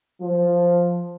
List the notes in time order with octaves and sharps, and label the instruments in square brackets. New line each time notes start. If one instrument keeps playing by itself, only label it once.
[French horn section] F3